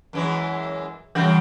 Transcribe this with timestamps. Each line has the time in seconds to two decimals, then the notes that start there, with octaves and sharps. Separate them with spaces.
0.13 F#2 E3 G#3
1.15 F#2 C#3 E3 G3 F#4 G6